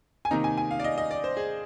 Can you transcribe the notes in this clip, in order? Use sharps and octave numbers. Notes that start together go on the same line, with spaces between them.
G#5
C3 D#3 A#3 D#4 A#5
G#5
G#5
F5
D5
D#5
D#5
D5
C5
G#4